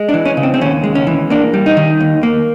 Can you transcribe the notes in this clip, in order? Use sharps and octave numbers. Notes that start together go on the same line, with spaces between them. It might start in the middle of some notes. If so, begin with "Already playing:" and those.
Already playing: G#3
D4
E3
C#4
C#3
C4
C4
D#2 C#4
G#3
C#4
E3
A#3 D4
G3
D#4
D#3
D#2
A#3